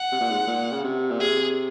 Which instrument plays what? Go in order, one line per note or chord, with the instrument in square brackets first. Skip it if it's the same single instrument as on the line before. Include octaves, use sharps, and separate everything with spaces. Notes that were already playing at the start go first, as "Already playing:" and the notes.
Already playing: [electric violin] F#5
[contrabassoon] C3
A#2
G#2
A#2
C#3
C3
A#2
[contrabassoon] C3 [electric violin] G#4